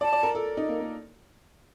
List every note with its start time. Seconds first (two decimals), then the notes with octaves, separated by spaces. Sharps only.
0.01 D5 A5
0.13 D5
0.23 A#4
0.35 A4
0.57 D#4
0.69 A#3
0.80 A#3